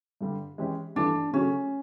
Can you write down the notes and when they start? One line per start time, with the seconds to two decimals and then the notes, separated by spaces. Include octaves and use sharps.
0.21 G2 D3 G3
0.58 E3 G#3 C#4 E4 G4
0.95 G2 E3 A3 D4
1.33 C#3 F#3 A3 C#4